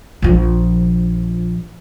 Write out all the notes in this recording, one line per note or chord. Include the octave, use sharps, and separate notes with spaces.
A#1 F3